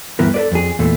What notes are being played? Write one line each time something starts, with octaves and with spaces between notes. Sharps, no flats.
D2 G2 E3 B3 A#4
A4 B4 D5
F2 G#4
E2 A#2 A3